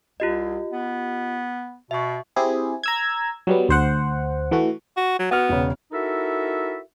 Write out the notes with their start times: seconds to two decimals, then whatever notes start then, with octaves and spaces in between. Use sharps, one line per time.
0.20 C2 F4 G4 D#5
0.72 B3
1.91 B2 E5 C#6
2.36 C4 E4 G4 G#4
2.83 A#5 E6 G#6
3.47 F#3 G3 B3
3.69 D2 C5 F#5
4.51 E3 A3 F#4
4.96 F#4
5.19 F#3
5.31 B3 F#4 F6
5.49 E1 C#3
5.92 D#4 E4 F#4 A4 A#4 E5